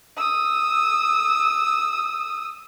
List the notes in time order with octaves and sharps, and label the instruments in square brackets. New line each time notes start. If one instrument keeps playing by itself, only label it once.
[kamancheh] D#6 E6